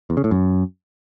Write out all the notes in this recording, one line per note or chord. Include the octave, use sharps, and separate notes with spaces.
E2
C#3
A2
F#2